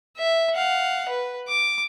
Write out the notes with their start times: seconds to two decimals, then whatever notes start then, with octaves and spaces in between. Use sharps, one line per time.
0.18 E5
0.53 F5 F#5
1.09 B4
1.48 D6